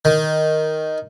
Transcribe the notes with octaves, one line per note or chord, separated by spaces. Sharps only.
D#3